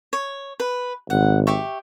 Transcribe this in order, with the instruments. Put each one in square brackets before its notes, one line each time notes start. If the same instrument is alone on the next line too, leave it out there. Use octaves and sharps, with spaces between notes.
[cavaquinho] C#5
B4
[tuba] G#1 [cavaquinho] F#5
[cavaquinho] G4 E5 C#6